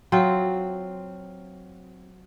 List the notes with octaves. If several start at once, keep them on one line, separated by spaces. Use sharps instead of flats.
F#3 C4 F4